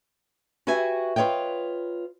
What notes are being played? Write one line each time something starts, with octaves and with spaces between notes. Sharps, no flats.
F#4 G4 B4 E5 G#5
F4 B4 C#5 D#5 G5